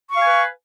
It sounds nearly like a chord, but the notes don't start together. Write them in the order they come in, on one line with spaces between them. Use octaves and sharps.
C#6 F5 G#5 B4